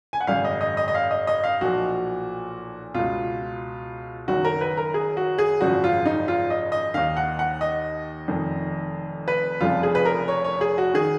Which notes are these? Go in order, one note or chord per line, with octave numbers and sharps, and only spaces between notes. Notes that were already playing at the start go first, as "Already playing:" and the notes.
G#5
F#5
G#1 F#2 C#3 F5
D#5
D#5
D#5
D#5
F5
D#5
D#5
F5
B1 A#2 F3 F#4
C#2 B2 F4
F#1 F#2 D#3 F#4
A#4
B4
A#4
G#4
F#4
G#4
G#1 F#2 C#3 F3 F#4
F4
D#4
F4
D#5
D#5
D#2 D#3 F5
F#5
F#5
D#5
F1 F2 D#3
B4
F1 F2 C#3 F3 F4
G#4
B4
A#4
C#5
C#5
G#4
F#4
D#3 G#4